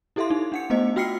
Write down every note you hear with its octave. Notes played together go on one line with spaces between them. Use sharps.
E4 G4 A4 E5 F5 C6
D#4
D4 F#5 C#7
A3 B3 C5 D#5
F4 F#4 G5 F6 C7 C#7